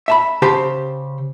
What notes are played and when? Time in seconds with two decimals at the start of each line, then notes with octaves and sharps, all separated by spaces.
0.08 E5 A5 B5
0.42 C#3 G4 C5 A5